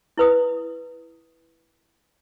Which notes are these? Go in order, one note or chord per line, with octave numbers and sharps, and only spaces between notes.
E4 B4 D#6